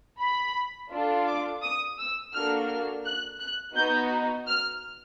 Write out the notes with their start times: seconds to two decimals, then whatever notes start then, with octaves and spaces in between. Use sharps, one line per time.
0.20 B5
0.91 D4 F4 A4
1.28 D6
1.62 D#6
1.99 E6
2.33 A#3 D4 F#4 A4 F6
2.69 F6
3.05 F#6
3.40 F#6
3.76 B3 D#4 F#4 G6
4.47 F6